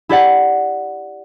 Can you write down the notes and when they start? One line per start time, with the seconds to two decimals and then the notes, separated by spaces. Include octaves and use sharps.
0.09 E4 G4 D5 F#5